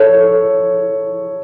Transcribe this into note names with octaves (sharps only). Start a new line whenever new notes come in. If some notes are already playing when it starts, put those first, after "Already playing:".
Already playing: A4 C#5